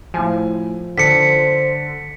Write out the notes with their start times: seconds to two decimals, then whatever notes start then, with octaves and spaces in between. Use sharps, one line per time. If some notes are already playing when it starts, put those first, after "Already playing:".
0.14 A2 F3 G#5
0.98 D3 C5 B6 C#7